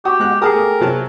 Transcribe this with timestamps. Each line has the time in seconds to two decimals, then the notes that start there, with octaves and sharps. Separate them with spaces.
0.05 F#4 G4 D#6
0.20 G#3 F#6
0.42 G4 G#4 A#4 F#5 A5 D#6
0.55 A3
0.80 C3 F#3 A5